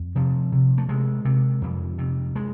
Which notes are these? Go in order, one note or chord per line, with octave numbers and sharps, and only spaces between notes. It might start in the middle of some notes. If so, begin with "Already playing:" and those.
Already playing: F2
C3 F3
C3
A3
C3 G#3
C3
F2
C3
G#3